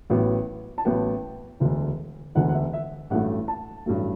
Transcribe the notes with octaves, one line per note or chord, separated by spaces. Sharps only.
A1 A2 F#3 B3
A5
A1 A2 F#3 B3 G5
E1 D2 D3
E1 D2 D3 F#5
F#5
E5
E5
A1 G2 F#3 A3 F#5
A5
A1 G2 F#3 A3